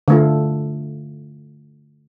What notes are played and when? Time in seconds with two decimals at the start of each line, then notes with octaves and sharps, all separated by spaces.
0.08 D3 A3 F4